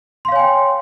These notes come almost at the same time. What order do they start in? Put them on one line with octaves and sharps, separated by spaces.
C6 F5 C#5 G#5 G5